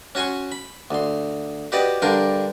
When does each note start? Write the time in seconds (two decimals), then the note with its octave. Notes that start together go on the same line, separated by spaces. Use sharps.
0.15 C#4 F#4 G#5 C6 C#6
0.52 B5
0.91 D2 C6
1.72 F#4 G4 B4 D5 D#5
2.02 G2 D3 D4 A#4 G5 C6